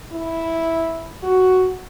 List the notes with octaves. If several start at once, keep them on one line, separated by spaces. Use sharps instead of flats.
E4
F#4